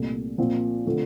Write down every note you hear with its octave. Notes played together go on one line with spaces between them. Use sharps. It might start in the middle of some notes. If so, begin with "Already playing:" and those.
Already playing: C2 A#2 A3
A#2 F3 C4
D3 F3 A3 C4